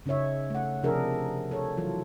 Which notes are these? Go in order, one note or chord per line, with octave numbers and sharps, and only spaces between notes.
C#3 C#4 D#4 C#5 E5
A3 F#5
C3 F3 D4 G#4 A#4 E5
A4 C#5
E3 F#3 F4